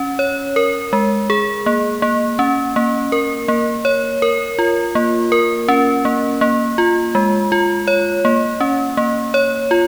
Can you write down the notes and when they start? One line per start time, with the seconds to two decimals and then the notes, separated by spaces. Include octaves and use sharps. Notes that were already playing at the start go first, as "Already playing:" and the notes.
Already playing: C#4
0.19 C#5
0.56 A#4
0.93 G#3
1.30 G#4
1.66 A#3
2.02 A#3
2.39 C#4
2.76 A#3
3.12 A#4
3.48 A#3
3.85 C#5
4.22 A#4
4.59 F4
4.95 A#3
5.32 A#4
5.69 C#4
6.05 A#3
6.41 A#3
6.78 F4
7.15 G#3
7.52 F4
7.88 C#5
8.25 A#3
8.60 C#4
8.97 A#3
9.34 C#5
9.71 F4